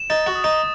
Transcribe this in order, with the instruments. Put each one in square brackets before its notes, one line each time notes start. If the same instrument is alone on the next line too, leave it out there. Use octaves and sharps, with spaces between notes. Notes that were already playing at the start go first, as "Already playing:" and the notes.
Already playing: [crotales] E7
[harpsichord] D#4 [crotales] A6
[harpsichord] F#4
[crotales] D#6
[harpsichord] D#4